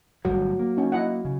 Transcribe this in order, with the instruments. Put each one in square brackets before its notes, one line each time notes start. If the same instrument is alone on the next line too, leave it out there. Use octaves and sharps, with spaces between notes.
[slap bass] G1 A2 G3 [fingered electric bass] F#3
[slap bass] A#3
[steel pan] C#4 D#4
E4 D#5 F#5
[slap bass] C#3